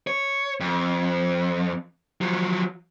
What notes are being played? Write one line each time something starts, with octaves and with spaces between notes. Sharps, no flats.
C#5
F2
F3 F#3